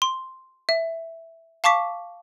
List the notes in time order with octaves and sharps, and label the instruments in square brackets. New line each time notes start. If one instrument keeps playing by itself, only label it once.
[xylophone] C6
E5
F5 A5 C#6 D6 B6